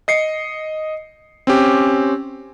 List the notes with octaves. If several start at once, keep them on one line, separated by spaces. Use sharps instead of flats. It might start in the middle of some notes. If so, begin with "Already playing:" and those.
D#5 C7 C#7
C4 C#4 G4